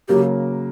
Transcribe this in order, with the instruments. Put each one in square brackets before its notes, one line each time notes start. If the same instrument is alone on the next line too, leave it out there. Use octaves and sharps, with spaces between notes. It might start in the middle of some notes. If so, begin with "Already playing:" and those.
[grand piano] C#3 F#3 A#3 [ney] G4